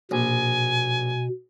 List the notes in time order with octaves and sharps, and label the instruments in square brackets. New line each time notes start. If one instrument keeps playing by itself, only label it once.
[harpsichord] A#1 [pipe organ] B2 [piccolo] G#5